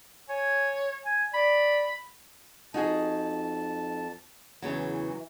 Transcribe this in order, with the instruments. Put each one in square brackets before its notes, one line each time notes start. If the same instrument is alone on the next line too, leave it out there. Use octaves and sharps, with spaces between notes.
[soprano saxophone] C#5 [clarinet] G#5
[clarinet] G#5
[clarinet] D5 [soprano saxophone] B5
[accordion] F2 A5 [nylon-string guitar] D#4 F#4 G#4
[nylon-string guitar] E2 C#3 F#3 [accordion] E3